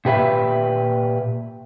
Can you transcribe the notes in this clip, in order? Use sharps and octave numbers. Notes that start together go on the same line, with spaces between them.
A#2 G4 B4 E5